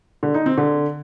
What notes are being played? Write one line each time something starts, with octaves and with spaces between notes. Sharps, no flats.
D3
D#4
C4
D3